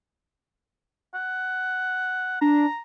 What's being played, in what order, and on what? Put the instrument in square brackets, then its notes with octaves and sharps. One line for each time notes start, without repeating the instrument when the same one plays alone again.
[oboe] F#5
[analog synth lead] D4 [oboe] A#5